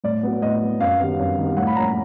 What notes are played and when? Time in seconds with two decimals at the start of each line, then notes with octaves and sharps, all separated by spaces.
0.04 A2 D5
0.23 F#3 B3
0.42 A2 D#5
0.62 F#3 B3
0.80 F#2 F5
0.99 D#3 G3 B3
1.19 F#2
1.38 D#3 G3 B3
1.57 A2 F#5
1.67 B5
1.76 F3 A#3 C#4 A#5